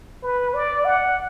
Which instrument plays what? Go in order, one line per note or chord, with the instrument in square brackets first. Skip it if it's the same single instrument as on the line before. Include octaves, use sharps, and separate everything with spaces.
[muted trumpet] B4
D5
F#5